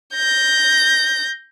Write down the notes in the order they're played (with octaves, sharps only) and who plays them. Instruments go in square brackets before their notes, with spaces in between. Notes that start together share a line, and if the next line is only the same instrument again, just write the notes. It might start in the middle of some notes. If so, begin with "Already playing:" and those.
[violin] G6 A#6